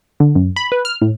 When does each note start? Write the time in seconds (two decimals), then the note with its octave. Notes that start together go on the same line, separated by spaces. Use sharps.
0.20 D3
0.35 F#2
0.56 B5
0.72 B4
0.85 F6
1.02 A2